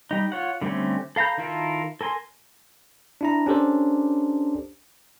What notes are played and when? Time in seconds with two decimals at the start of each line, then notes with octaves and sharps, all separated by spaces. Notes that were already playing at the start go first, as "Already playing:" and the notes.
0.11 G3 D#4
0.32 F4 C#5 F#5
0.61 D3 G3 A3 C4 C#4
1.16 A4 F5 A#5 B5 G6
1.38 D#3 E4 F4 A4 A#4
2.01 A4 A#4 G#5 C6
3.21 D4 E4 A#5
3.46 C#4 D4 G4 A4 A#4 C5